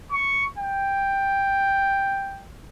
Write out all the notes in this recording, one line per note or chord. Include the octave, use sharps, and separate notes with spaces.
C#6
G5